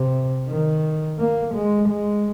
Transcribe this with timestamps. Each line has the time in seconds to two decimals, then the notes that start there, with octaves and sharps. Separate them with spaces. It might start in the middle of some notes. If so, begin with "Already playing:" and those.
Already playing: C3
0.49 D#3
1.19 A#3
1.55 G#3
1.89 G#3